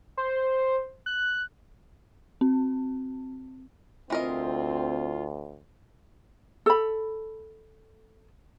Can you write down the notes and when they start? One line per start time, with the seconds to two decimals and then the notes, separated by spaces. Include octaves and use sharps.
0.17 C5
1.06 F#6
2.41 C4
4.10 D2 E3 C4 F4 A#4 D#5
6.66 A4 B5